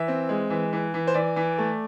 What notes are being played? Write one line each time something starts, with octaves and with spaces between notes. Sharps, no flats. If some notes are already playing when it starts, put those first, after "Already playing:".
Already playing: E3 E5
C4
G#3
E3
E3
E3
C5
E3 D5
E3
A3